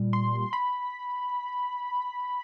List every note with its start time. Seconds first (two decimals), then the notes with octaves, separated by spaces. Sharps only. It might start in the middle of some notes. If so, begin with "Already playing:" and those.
Already playing: A#2 G3
0.13 C6
0.53 B5